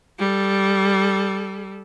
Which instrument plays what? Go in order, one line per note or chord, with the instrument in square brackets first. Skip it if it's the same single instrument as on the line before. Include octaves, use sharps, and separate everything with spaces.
[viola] G3 A4